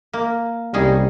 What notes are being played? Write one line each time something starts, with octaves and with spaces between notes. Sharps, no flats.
A#3
C2 G3 C#4 D#4 G#4